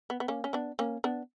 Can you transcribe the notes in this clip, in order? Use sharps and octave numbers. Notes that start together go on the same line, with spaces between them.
B3
B3
A#3 C#4
C#4
B3 D4
A#3 C#4
B3 D4